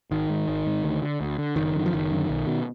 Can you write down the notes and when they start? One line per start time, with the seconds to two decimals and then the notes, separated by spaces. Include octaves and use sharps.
0.11 G#1 D#3
0.29 G#2
0.48 G#1
0.66 G#2
0.84 D2
1.02 D3
1.21 D2
1.38 D3
1.56 F#1 D#3
1.75 F#2 D3
1.86 F3
1.93 F#1 D#3
2.11 F#2 D3
2.29 B1
2.47 B2